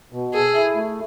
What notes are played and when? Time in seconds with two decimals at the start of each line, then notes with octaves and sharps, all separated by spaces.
0.13 B2
0.34 G#4 A4
0.54 E4
0.75 A3